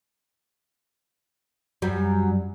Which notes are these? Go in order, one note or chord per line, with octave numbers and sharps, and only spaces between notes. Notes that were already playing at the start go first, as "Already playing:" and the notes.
F#2 G3